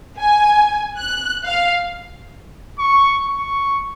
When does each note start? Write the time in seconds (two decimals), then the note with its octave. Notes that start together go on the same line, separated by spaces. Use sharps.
0.19 G#5
0.99 F#6
1.45 F5
2.79 C#6
3.29 C#6